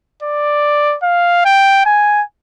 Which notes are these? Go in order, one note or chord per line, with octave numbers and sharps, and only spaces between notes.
D5
F5
G5
G#5